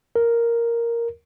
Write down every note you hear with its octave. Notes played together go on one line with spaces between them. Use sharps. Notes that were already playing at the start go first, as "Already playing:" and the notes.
A#4